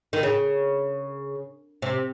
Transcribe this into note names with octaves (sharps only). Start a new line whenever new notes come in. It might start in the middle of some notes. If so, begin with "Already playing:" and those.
D#3
C#3
C3